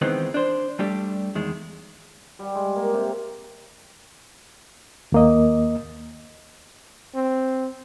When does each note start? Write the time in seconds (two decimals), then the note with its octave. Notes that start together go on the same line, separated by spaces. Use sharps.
0.02 D#3 E3 G#3 B3 C4 D#4
0.34 D4 C5
0.79 G3 A3 D4 G4
1.35 E2 D#3 G#3
2.39 G3
2.55 G#3
2.76 A#3
2.94 C3
5.12 D#2 A#3 D#5
7.15 C4